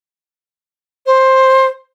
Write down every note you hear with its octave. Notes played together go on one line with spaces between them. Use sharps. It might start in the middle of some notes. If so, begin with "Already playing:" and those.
C5